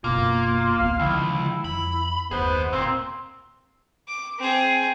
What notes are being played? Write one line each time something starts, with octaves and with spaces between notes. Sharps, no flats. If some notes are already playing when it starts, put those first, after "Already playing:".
F#1 B2 A#3 F4
A1 D2 B3 F5
C#2 D3 D#3 F3 E4
F2 B5
F#1 D#2 B3 G#4 C5
A#2 C4
D6
C4 G#4